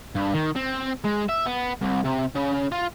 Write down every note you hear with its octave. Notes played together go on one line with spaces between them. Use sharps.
G2
D#3
C4
G#3
E5
B3
C2
C3
C#3
F4